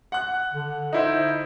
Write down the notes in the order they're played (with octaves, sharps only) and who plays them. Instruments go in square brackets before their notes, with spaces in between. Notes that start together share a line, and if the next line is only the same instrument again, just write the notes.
[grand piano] F#5 F#6
[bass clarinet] D3
[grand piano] D#4 E4 C5